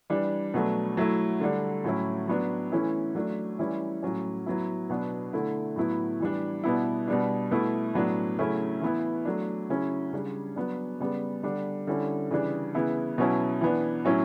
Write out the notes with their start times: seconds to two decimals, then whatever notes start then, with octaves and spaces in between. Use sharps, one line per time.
0.10 E3 G3 D4
0.54 B2 F#3 A3 D4
0.97 F#3 A3 E4
1.40 D3 G3 D4
1.84 A2 F#3 C#4 E4
2.28 F#3 B3 D4
2.72 E3 A3 C#4 E4
3.15 F#3 A3 D4
3.59 E3 G3 C#4 E4
4.03 A2 F#3 C#4
4.46 F#3 B3 E4
4.89 B2 F#3 B3 D4
5.33 D3 A3 E4
5.76 A2 F#3 B3 E4
6.20 E3 G3 D4
6.63 B2 G3 B3 E4
7.08 B2 G3 D4
7.51 B2 A3 E4
7.94 A2 F#3 B3 D4
8.39 C#3 F#3 A3 C#4 E4
8.81 E3 B3 E4
9.25 F#3 A3 D4
9.70 C#3 F#3 C#4 E4
10.13 C#3 G3 D4
10.56 F#3 B3 D4
11.00 C#3 G3 B3
11.43 D3 G3 D4
11.87 D3 G3 C#4 E4
12.30 C#3 E3 G3 D4
12.75 C#3 E3 B3 E4
13.18 B2 F#3 C#4 E4
13.61 E3 B3 D4
14.05 A2 F#3 C#4 E4